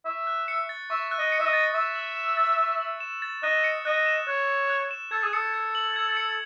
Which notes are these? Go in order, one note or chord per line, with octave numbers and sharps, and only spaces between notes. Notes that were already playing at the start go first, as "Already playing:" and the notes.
E5 C#6
F#6
C#7
A6
E5 C#6
F#6
D#5
C#7
E5
D#5
A6
E5 C#6
E6
E7
A6
C#6
E6
E7
A6
D#5 F#6
C#7
D#5 F#6
E7
C#5 F#6
C#7
F#6
E7
A4 G#6
G#4
A4 C#7
G#6
F#7
G#6
C#7